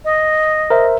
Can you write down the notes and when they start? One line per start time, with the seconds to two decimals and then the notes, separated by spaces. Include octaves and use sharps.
0.05 D#5
0.70 A#4 C5 E5